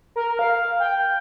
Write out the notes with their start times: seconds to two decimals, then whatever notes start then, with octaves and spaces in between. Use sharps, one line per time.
0.16 A#4
0.39 F5
0.80 G5